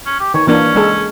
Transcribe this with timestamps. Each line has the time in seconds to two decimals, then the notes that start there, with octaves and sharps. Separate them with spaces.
0.06 C#4
0.20 G4
0.34 D#3 C#5
0.47 E3 A#3 C#4 D4
0.76 G#3 A4